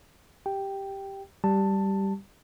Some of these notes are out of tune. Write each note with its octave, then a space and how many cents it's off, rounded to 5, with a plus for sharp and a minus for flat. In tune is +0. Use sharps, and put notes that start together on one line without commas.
G4 +0 G5 +0
G3 +0 G4 -10 A5 +10